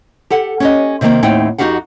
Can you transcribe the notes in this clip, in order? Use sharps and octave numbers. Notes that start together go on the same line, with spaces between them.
G4 A4 F#5
C#4 G4 D#5
C3 D#3 G3 A#3 C4
D#2 A2 C4 D#4 F#5 G5
F2 D#4 F#4 G4 F5 F#5